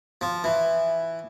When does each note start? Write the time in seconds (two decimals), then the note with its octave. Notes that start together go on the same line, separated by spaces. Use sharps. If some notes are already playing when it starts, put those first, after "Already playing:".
0.21 F3
0.44 E3